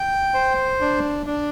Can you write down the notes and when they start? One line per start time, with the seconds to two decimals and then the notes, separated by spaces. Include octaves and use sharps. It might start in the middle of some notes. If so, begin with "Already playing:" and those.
Already playing: G5
0.34 C5
0.81 D4
1.26 D4